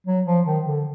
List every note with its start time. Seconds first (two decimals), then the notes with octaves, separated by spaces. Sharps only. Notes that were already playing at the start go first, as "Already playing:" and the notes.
0.07 F#3
0.26 F3
0.46 D#3
0.66 D3